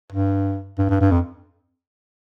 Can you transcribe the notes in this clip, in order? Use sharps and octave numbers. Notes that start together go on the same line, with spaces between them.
G2
G2
G2
G2
F2